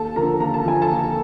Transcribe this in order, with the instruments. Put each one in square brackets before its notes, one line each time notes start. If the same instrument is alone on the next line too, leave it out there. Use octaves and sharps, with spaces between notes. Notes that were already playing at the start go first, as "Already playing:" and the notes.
Already playing: [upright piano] D#2 A4 A5
D3 F3 A#4 A#5
D#2 A#5
A5
D3 F3 G#5
A4 A5
D#2